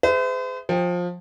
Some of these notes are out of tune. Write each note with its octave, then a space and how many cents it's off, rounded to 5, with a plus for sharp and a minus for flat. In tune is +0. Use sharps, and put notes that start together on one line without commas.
G#4 +0 C5 -45 E5 +0
F3 +20 G5 +25